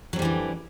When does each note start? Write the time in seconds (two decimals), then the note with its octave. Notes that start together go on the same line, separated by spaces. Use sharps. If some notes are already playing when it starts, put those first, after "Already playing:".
0.13 F#3
0.16 F2
0.19 G3
0.22 E3
0.25 D3